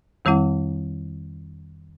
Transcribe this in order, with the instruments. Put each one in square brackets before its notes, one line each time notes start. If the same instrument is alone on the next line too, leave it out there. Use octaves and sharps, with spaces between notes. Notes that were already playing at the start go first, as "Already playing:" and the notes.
[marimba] F2 D#3 G3 C4 E4 F#5